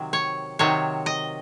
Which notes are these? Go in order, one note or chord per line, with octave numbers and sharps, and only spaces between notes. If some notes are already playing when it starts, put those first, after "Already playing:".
Already playing: C3 D#3 F#3
C#5
C3 D#3 F#3 C#5
D#5